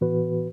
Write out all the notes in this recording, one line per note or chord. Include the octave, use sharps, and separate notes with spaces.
A2 E3 B3 F#4 B4